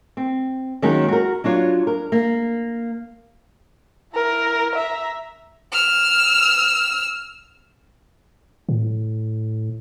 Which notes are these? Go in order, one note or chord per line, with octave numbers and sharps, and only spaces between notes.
C4
D#3 F#3 G#3 A#3 C#4 A#4
F#4 A#4
F#3 D4 F4 C#5
A#4
A#3
E4 A#4
E5 A#5
E6 F6
A2